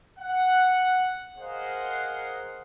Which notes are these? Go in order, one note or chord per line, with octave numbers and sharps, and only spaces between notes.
F#5
G#4 A#4 C5 D#5 F5 F#5